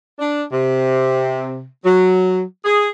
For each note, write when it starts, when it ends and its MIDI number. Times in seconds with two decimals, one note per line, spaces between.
0.19 0.42 62
0.52 1.65 48
1.84 2.41 54
2.65 2.87 68